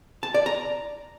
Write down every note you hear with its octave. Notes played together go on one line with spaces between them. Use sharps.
A5
D5
A#5